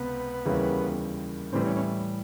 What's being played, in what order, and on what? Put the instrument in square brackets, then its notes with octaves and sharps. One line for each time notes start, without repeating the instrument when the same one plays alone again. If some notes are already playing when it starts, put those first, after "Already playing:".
Already playing: [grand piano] C#2 C3 [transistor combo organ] B3
[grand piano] D#2 C#3 E3 G3 A#3
[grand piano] A2 E3 G3 [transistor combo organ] C4
[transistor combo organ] C#4
C#4